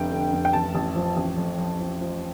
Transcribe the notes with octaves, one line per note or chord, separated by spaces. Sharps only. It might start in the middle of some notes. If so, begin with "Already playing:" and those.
Already playing: F1 D3 G5
D3
F1
G5
A1 A5
A1
F3
A1
F2
F2
F3
F3